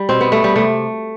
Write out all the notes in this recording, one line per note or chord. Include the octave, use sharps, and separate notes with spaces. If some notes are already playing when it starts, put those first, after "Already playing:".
Already playing: G3
B2 C4
B3
G3 A3
G3
C3 A3